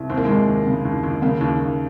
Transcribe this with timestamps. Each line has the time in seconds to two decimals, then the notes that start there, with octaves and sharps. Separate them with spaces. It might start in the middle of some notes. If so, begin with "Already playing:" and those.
Already playing: C2
0.10 D#2 C4
0.17 A#3
0.25 G#3
0.28 D#2 A#3
0.48 D#2
0.66 C#3
0.85 D#2
1.04 D#2
1.22 C#3 A#3
1.41 D#2
1.59 D#2